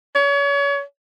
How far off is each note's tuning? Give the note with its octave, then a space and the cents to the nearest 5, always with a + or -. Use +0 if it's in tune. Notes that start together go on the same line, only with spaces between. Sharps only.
C#5 +35